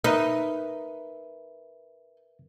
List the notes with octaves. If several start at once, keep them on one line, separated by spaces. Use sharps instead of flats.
D#4 A#4 B4 E5